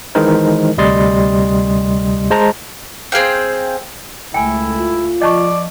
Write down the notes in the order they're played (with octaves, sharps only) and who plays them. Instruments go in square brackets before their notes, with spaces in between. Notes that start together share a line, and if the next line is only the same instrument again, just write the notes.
[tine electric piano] D#3 E3 G#3 D#4 A#4 C5
D2 C3 G3 D#5 C6 A6
G#3 C5 A5 A#5
[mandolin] C4 G#4 F5 G5
[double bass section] C#2 A3 [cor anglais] E4 [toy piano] G5 G#5
[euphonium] F4
[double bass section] F3 [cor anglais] D5 [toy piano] D#5 A5 C#6